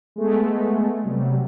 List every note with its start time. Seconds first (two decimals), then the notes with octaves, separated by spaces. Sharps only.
0.16 G#3 A3 B3
1.04 C3 F#3 G3